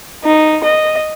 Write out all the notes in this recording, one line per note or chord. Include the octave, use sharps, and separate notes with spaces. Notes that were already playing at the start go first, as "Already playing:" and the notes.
D#4
D#5